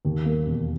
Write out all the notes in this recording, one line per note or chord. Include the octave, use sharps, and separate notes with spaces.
D#2
A#3
E1